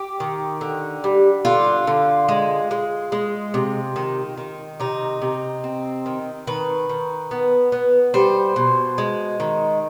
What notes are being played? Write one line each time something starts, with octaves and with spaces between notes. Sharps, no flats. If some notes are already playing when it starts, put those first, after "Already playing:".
Already playing: G4
D#3
D3
G3
D3 F4
D3
G#3
G#3
G#3
C3
D#3
D#3
C3 D#4
C3
C4
D#3
D#3 B4
D#3
B3
B3
G3 C5
B2
G#3
D#3